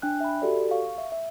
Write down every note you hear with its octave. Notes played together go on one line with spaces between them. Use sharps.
D4 G5 G#5 F#6
E5 B5
F#4 G4 A4 D5
F5 C#6
E5
E5